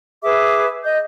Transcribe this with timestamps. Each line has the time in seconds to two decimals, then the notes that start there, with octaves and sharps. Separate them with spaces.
0.23 G#4 B4 E5 D6
0.85 D#5 G6